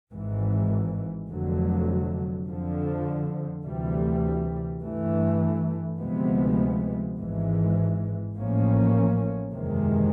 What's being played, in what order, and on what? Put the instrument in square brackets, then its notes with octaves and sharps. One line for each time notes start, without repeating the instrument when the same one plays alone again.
[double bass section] G#1 G#2 E3
F1 F2 D3 F#3
F2 D3 F3
D2 C3 E3 G3
G2 E3 A3
D2 C3 F3 G#3 B3
G#1 G#2 E3 G#3
A1 A2 F3 A#3 C#4
F#1 E2 C3 D#3 G#3